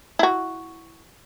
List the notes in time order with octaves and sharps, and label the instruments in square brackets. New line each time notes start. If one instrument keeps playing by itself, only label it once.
[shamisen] E4 F#4